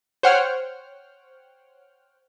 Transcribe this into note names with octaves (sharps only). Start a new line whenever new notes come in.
C5 C#5 F#5 G5 F6